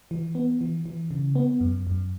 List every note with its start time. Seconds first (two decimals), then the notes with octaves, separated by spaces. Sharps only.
0.11 E3
0.35 B3
0.61 E3
0.86 E3
1.11 C#3
1.35 B3
1.61 F#2
1.87 F#2